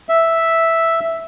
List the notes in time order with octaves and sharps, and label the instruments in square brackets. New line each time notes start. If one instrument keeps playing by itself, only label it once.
[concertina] E5